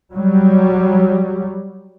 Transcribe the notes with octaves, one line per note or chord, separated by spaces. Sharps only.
F#3 G3